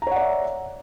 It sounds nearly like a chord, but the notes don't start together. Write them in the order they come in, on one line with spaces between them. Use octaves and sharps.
A#5 C#5 F#5 D5 E5